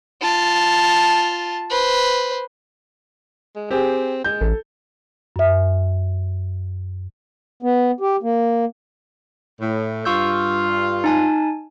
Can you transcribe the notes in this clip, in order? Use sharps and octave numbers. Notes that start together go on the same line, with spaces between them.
F4 A5
B4 C5
G#3
C4 G4 G#4
G#3 G6
A1 A4
F#2 E5
B3
G4
A#3
A2
G2 F4 C#6 E6 G6
D#4 G#5 A5